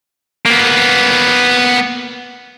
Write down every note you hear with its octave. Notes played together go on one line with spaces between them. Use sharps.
A#3 B3